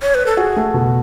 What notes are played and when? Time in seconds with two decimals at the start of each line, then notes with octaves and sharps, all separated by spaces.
0.02 C#5
0.15 B4
0.26 A4
0.37 F#4 G#4
0.57 A3
0.74 B2